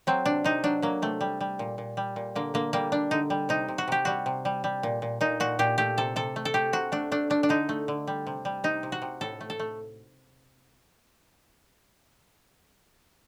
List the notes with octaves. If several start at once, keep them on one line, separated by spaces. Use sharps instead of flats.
F#3 C4
C3 D4
C3 D#4
F#3 D4
F#3 A#3
C3 A3
G3
G3
A#2
A#2
G3
A#2
D3 A#3
D3 A#3
G3 A#3
G3 D4
D3 D#4
G3
C3 D#4
C3
F#4
C3 G4
G3 F#4
C3
G3
G3
A#2
A#2
A#2 D#4
A#2 F#4
A#2 G4
A3 G4
C3 A4
C3 A4
A3
A4
A3 G4
C3 F#4
A3 D4
A3 D4
A3 D4
D4
D3 D#4
A3
D3
G3
C3
G3
C3 D#4
C3
F#4
C3
A2 A4
A3
A4
A3